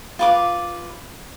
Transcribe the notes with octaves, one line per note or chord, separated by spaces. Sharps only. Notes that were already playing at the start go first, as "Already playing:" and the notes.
F4 B4 D6